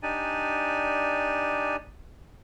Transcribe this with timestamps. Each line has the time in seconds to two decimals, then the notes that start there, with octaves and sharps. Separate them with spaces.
0.03 D4 D#4 G4 D5 G#5